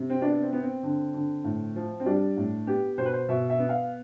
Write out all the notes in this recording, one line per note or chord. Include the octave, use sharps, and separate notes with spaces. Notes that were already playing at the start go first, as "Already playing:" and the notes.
Already playing: C3
C4
B3 D4
C4
B3
C4
D3
D3
A2
F3
C4
G3 D4
A2
B3 G4
B2 C5
B4
C5
B2 E5
E5
B3
F5